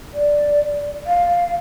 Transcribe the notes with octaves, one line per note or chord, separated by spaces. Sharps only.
D5
F5